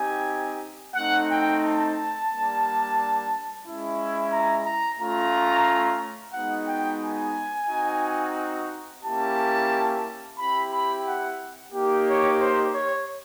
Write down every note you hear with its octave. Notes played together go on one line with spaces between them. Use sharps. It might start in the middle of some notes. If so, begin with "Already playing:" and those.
Already playing: C4 D#4 G4 G#5
A3 C4 D#4 F#5
G5
A5
G3 A#3 D4
G#3 C#4 E4
A#5
A#5
A3 C#4 F4 A#5
G#3 B3 D#4 F#4 F#5
G5
G#5
C4 D#4 F#4
A#3 C#4 E4 G4 A5
C4 E4 G4 B5
B5
F#5
A#3 D#4 G4
C#5
C5
C#5